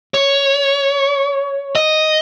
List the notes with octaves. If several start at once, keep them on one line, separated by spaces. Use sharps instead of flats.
C#5
D#5